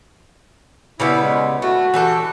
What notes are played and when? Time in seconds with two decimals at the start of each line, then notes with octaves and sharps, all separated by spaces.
1.00 C#3 G3 B3 E4
1.20 G#3
1.62 A3 F#4
1.94 E3 G3 A4